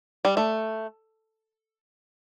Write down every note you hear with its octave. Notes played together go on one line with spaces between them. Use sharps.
G3
A3